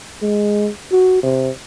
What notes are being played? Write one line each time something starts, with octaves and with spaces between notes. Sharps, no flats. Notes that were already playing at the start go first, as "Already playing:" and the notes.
G#3
F#4
C3